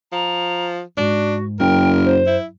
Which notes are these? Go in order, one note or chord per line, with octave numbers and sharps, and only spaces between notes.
F3 A#5
G#2 D4 F#4
F#1 F#2 A#4 G5
C5
E4